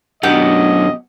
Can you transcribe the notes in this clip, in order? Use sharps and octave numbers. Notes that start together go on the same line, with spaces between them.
F#2 B2 D4 G4 D#5 F#5